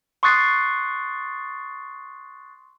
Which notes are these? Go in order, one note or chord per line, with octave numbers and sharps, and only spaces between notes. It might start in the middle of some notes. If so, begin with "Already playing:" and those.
C6 C#6 D#6 F#6 A6 C7